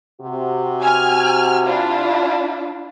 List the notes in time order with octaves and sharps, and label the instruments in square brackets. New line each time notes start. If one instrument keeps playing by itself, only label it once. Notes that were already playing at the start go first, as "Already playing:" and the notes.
[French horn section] C3 F#4
[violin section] G#5 F6
D4 E4 F4